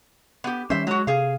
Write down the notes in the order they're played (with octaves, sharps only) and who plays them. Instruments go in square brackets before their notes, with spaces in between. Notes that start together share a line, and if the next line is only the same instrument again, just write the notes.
[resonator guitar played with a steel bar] B3 G4
[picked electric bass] D#3 G3 C#4 [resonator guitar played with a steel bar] C5 E5
[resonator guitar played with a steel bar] F#3 F#4 [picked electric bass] G#3
[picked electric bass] C3 [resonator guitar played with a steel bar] G#4 F5